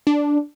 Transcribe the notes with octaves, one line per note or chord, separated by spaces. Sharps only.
D4